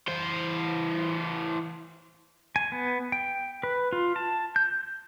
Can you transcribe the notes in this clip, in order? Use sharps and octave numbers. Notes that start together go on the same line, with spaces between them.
E3 C5
G#5
B3
G5
B4
F4
A5
G6